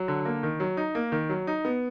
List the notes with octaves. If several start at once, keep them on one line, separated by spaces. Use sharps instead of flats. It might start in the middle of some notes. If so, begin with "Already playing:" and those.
Already playing: F#3
D3
A#3
D#3
F#3
D#4
A#3
D#3
F#3
D#4
B3